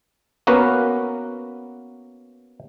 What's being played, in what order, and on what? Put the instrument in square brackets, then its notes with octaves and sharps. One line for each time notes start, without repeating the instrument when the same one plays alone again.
[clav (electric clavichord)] A#3 B3 C#4 F#4 A#4 B4